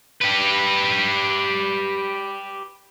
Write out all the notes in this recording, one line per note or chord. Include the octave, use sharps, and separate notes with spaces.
G4 B4